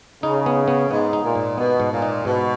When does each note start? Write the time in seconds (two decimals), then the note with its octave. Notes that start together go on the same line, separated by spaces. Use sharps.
0.23 C#3 D#4
0.46 B3
0.68 B3
0.91 G#2 B3
1.13 D#4
1.24 A#2
1.35 G#2
1.58 B2 B3
1.80 G#2
1.92 A#2
2.02 D#4
2.25 G#2 B2